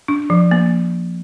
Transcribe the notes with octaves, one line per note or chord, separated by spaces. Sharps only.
D4
F3
A#3